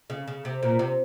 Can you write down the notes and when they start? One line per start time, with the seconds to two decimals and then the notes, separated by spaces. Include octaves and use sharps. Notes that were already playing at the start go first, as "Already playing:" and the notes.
0.10 C#3
0.27 C#3
0.45 C3
0.63 A#2
0.79 C3